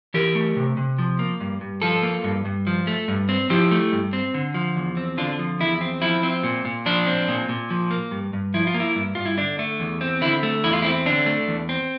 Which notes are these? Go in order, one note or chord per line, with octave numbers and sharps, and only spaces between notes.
E3 G4 A#4
A3
C3
C3
F3
A#3
G2
G2
F3 F4 A4
A#3
G2
G2
F3
A3
G2
C4
F3 E4 G4
A3
G2
C4
D3
F3
E2
C4
D3 D4 F4
F3
E2 E4
C4
F3 E4
C4
A#2
A#2
F3 D4
C4
A#2
A#2
F3
A#3
G2
G2
F3 E4
F4
A#3
E4
G2
G2 F4
E4
D3 D4
A3
E2
C4
D3 E4
A3
E2 E4
F4
C4 E4
D3 D4
A3
E2
C4